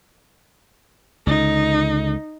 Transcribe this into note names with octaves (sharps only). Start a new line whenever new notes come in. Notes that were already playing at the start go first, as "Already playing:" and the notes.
C#2 D3 D#4